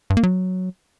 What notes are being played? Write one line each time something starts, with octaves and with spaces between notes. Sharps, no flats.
G2
A#3
F#3